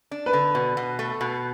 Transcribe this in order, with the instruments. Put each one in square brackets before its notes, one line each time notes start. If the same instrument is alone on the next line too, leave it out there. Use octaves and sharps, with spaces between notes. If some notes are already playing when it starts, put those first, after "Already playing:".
[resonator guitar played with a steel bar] D4
[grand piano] B4
[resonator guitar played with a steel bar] D3
B2
B2
A3
B2